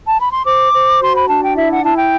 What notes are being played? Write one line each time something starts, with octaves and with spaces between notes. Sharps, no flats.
A5
B5
C6
C5 D6
C5
F#4 C6
B5
D4 A5
G5
E4 E5
F#5
E4 A5
G5